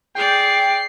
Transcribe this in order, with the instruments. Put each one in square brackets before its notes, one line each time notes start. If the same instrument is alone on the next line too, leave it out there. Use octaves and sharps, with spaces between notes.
[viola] G#4 D5 [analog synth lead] G5 [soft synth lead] C7